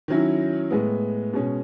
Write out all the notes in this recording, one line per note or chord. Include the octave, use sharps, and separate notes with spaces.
D#3 F#3 C#4 E4
A2 G#3 B3
B2 G#3 C#4